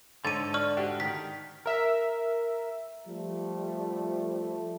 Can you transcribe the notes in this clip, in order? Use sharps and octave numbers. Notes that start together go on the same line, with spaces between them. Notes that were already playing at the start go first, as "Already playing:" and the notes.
G#2 D3 A4 C#5 A6 D#7
D5 C#6 F6
D4 F#4 G4
D#3 B6
A#4 E5
F3 G3 A3